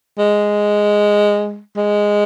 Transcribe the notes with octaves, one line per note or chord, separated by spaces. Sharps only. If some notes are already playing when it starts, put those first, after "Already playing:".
G#3
G#3